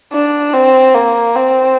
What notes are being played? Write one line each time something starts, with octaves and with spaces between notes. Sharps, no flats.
D4
C4
A#3
C4